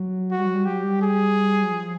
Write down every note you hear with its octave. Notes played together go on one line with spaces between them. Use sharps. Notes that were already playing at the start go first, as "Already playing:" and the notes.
Already playing: F#3
F#4
G3
F#3
G3
F#3 G4
G3
G#4
F#3
F3